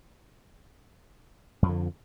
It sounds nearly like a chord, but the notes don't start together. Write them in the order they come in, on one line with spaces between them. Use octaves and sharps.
F2 F3 D3